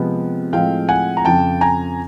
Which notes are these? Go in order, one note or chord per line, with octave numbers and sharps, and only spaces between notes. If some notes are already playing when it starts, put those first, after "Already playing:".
Already playing: C3 F3 G#3 B3
A2 F3 G#3 C4 F5 G5
F#5 G#5
A#5
F2 C#3 F3 G5 A5
G#5 A#5